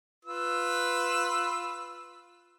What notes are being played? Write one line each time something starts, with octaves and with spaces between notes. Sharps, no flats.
F4 B4 E6